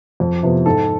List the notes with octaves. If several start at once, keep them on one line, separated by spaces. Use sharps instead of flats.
F2
C3 F3 B3
G#2 A4